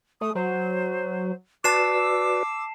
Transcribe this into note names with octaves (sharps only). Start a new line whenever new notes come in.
A3 D#6
F#3 C5
F#4 B4 D5 A5 D6 E6 C7 E7